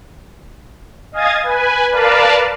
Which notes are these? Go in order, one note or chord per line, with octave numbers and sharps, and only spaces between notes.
D#5 F5 G#5 D#6 G#6 A6
B4 G#5
A#4 B4 D5 F5 A5